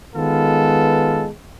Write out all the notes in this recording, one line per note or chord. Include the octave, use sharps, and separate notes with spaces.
D#3 G#3 B3 F4 A4 B4